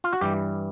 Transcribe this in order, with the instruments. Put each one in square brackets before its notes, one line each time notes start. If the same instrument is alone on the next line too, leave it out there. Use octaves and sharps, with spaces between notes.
[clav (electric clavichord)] F4
F#4
G2 E3 G3 G4